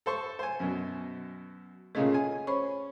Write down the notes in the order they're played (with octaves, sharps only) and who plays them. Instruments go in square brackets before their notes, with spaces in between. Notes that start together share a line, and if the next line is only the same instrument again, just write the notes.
[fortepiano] A4 C5 C#6
C5 G#5
F#2 B2
[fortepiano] A#2 C#3 A3 [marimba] G#4 D#5 F5
[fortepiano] G#5
[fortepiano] C#4 [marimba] C5 B5 C#6